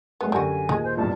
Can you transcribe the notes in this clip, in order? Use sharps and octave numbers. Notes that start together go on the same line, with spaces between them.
F#3 G#3 A3 B3
F#2 D3 G3 F#4 G#5
D#2 A#2 G#3
C5
A#1 E2 G2 A5